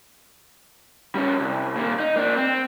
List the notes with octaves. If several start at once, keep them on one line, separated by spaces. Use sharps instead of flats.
G3 C#4
C2
A#2 D#3
D#4
A#3 D4
C4